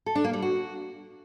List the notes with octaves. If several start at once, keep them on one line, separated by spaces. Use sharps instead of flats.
A4
D4
A#3
G3
F#4